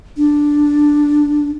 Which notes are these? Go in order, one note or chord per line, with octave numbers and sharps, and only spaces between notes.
D4